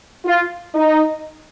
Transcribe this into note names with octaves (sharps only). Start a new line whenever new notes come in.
F4
D#4